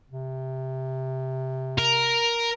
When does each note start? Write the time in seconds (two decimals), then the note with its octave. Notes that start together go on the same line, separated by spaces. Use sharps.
0.10 C3
1.78 A#4